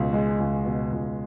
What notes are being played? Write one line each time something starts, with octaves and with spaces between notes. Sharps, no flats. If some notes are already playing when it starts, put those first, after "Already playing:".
Already playing: C#2 B2
G#3
C#2
B2
C#2